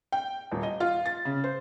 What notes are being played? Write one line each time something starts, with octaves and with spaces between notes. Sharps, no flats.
G5
D#1
D#5
F4
A6
C#3
C5